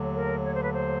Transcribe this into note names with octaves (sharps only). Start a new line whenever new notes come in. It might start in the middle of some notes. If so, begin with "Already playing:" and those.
Already playing: D#2 D3 F#3 A3
A#4
C#5
C5
B4
C5